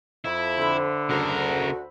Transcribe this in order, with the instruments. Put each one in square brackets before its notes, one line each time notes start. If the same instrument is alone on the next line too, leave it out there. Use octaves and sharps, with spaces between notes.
[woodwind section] F2 [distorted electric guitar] E4
[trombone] D3 [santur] C5 E5 B5
[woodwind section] D2 F#4 [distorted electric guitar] C#3 A#4